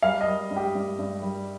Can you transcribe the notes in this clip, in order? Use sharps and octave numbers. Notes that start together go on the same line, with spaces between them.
G3 F5
D#5
G3
G2
G4
G2
G2
G3